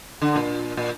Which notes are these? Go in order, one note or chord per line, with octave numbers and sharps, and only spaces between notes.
D3
A#2
A#2